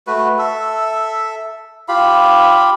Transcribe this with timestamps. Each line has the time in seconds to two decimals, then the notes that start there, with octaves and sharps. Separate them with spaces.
0.07 A3 F#4 B4
0.39 A4 E5
1.88 F4 G4 F5 B5